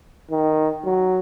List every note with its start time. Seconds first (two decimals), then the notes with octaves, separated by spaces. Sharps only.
0.31 D#3
0.85 F#3